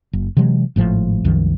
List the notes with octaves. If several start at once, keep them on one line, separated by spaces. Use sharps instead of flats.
F#1
C3 E3 F#3 G#3
G#1 A2 F3
C2 F#2 D#3 F3